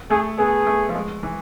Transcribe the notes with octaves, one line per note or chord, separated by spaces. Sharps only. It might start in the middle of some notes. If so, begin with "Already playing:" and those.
A3 G#4
B3 G#4
A3
F3
G#3
E3